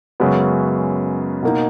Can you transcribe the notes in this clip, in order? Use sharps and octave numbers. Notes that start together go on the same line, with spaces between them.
F#2 C#3 G#3 B3 F#4
B2 A#3 D#4